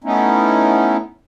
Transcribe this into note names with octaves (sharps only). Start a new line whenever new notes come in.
A3 B3 C#4 D#4 E4